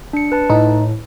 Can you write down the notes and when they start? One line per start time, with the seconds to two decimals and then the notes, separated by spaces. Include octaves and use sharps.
0.13 D4 C#7
0.32 B4 A5
0.50 A2 D#4